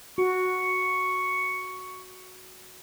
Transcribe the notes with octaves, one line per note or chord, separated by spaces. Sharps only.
F#4 C#6